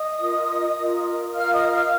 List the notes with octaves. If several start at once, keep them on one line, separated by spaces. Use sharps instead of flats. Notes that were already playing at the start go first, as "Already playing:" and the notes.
Already playing: D#5 D#6
F4 A#4
F4 A#4
F4 A#4 F5 F6
D#5 D#6
F5 F6